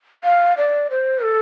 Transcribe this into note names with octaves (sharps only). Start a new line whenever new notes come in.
F5
D5
C5
A4